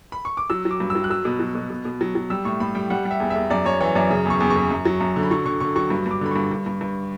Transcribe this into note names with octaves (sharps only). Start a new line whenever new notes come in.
B5
C#6
D6
F#3 E6
F#3
D6
G2
E6
F#3
F#6
F#3 E6
B2
F#3
B2
B2
B2
F#3
F#3
G3 E6
A2 C#6
A2 B5
G3 G5
G3 F#5
G3
E5
E2
E5
E2
F#2 D5
F#2 C#5
E3 C#5
F#2 D5
C#3
E2 C#6
E2
C#6
E2
F#2
F#3
F#2
D3
B5
F#3 C#6
D3 C#6
D3 C#6
F#3 C#6
G2
G2 D6
D3 B5
G2 C#6
G2
G2
G2